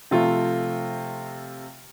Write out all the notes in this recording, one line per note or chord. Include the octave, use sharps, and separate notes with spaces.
C3 F3 A3 F4